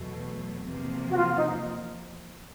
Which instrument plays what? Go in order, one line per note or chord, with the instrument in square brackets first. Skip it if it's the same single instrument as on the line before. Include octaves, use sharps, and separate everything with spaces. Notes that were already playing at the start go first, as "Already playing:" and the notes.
Already playing: [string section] E2 B2 F#3 A3
E2 C3 F3 A#3
[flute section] F#4
F4
D#4